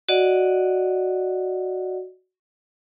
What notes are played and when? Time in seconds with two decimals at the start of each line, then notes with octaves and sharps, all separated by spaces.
0.09 F#4 D5 D#5 F#5